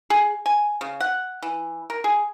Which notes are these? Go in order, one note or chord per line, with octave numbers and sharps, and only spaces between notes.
G#4
G#5
C#3
F#5
E3
A#4
G#4